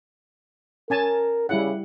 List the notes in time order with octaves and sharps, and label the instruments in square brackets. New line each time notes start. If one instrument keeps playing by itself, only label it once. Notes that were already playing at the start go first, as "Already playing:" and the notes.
[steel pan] C#4 G#5 A5 [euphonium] A#4
[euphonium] C#3 [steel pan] G3 E4 F#5